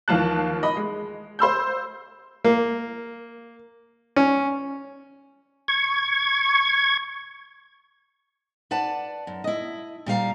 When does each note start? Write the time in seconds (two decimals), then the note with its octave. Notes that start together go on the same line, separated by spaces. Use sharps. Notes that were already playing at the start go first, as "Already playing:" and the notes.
0.08 D#2 E3 F3 F4 A5 F#6
0.63 D#5 B5
0.77 G#3
1.39 C5 C6 E6 G6
2.44 A#3
4.16 C#4
5.68 C#6 G#6
8.71 B4 D5 F#5 A5
9.27 F#2
9.44 E4 D#5
10.06 A#2 G3 F5 A#5